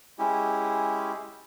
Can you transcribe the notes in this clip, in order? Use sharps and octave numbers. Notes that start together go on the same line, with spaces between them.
G#3 C#4 E4 G4